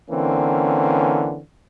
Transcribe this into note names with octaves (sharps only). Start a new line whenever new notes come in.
D3 E3 A#3 C4 C#4